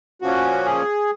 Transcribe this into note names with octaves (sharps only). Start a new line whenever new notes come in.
A#2 F3 A#3 C#4 F#4
G#4